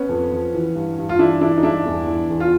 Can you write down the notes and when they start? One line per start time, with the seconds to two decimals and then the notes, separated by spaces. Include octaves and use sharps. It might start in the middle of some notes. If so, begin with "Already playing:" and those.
Already playing: B3 C#4
0.09 F2
0.31 F3
0.54 E3
0.75 G2
0.98 G2
1.09 F4
1.19 E3 D4 E4
1.41 E3 D4 E4
1.58 D#4
1.63 G2 D4 E4
1.86 E2
2.07 E3
2.30 E2
2.40 F4